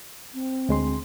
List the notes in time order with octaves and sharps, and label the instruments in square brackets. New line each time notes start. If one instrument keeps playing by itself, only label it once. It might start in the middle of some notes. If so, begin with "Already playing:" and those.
[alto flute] C4
[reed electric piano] D2 G#3 C6